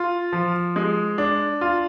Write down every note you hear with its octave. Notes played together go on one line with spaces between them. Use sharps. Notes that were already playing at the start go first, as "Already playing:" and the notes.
Already playing: F4
F3
G#3
D4
F4